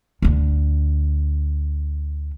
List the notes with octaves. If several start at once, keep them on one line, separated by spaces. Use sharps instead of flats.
D2 D3